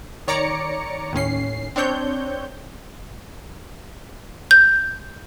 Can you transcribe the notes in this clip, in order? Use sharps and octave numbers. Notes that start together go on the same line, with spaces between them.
D#3 C#5 D5 A#5 D6 C#7
D#2 A2 C#4 C7
C4 D4 C#5 G6
G6